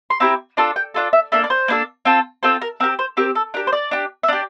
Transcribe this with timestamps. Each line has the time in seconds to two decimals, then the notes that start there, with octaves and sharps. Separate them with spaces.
0.10 C6
0.20 C4 E4 G4 A#5
0.57 D4 F4 A4 A5
0.76 G5
0.94 D4 F4 A4
1.13 E5
1.32 A#3 D4 A4 E5
1.44 D5
1.50 C5
1.68 A#3 D4 A4
2.05 C4 F4 A4
2.43 C4 F4 A4 C5
2.62 A#4
2.80 C4 A#4
2.83 G4
2.99 C5
3.17 C4 G4 A#4
3.35 A4
3.54 D4 G4 A#4
3.67 C5
3.73 D5
3.91 D4 G4
4.23 E5
4.28 D4 G4 D5